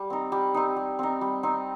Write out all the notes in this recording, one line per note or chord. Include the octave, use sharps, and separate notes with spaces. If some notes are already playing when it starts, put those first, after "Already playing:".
Already playing: G3
C4 D#4
G3
C4 D#4
G3
C4 D#4
G3
C4 D#4